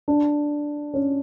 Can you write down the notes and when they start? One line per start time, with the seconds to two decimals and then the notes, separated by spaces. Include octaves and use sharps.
0.08 D4
0.94 C#4